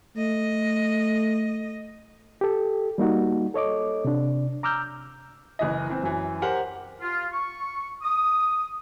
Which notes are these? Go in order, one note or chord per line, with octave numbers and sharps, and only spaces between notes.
A3 D#5
G4 A4
G3 A#3 D#4 F#4
A4 C#5 D#5 D6
C3 D4
A#5 D6 E6 F6 G6
F#1 E3 D#5
E3 C4
F#2 E3
G4 A#4 C5 F#5 G#5
F4
C#6
D#6